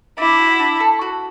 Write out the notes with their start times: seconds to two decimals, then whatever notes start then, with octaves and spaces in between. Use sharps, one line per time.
0.18 D4 E4
0.39 F#4
0.59 D4
0.80 A4
1.02 F#4